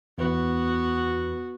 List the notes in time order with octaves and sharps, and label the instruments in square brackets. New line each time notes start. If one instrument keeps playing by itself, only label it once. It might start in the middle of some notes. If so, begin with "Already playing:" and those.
[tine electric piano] E2 B4 [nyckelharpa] B3 F#4